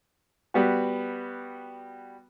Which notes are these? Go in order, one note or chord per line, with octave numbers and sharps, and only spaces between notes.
G3 B3 F#4